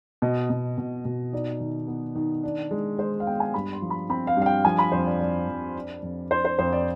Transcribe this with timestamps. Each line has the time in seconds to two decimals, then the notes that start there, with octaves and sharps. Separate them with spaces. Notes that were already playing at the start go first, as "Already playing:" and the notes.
0.22 B2 D#5
0.50 B2
0.78 B2
1.05 B2
1.33 D#4 D5
1.60 D#3
1.88 B3
2.15 D#3
2.43 D4
2.71 G#3
2.98 G#3 C5
3.20 F5
3.27 B3 G5
3.40 G#5
3.54 G2 B5
3.73 C6
3.82 F3
3.90 B5
4.09 C4 B5
4.27 F5
4.37 G2
4.42 F5
4.46 G5
4.65 F3 G#5
4.78 B5
4.92 F2 C5
5.06 D5
5.20 F2 D5
5.48 F2
5.76 D4
6.02 F2
6.31 D4 C5
6.45 C5
6.59 F2 C5
6.73 D5